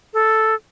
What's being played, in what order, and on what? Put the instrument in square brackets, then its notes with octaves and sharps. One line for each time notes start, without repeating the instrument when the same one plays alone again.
[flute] A4